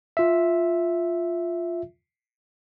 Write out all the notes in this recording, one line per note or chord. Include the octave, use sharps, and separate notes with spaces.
F4 E5